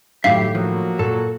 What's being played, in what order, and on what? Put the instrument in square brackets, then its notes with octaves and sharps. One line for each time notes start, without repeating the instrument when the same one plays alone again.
[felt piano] A2 D#3 [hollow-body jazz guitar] F#3 E5 [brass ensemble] G4 [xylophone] F5 C7
[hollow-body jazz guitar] F3 [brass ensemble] F#3 A#3 F#4
[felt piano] A#2 [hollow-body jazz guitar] A4